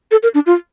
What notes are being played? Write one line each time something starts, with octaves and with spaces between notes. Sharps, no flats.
A4
A#4
D4
F4